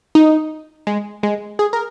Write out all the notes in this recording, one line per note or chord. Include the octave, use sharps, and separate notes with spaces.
D#4
G#3
G#3
G#4
A#4